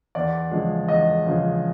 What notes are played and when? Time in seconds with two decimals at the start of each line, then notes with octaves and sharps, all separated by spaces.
0.15 E2 D5
0.51 C#3 F3 G#3
0.88 E2 D#5
1.26 C#3 F3 G#3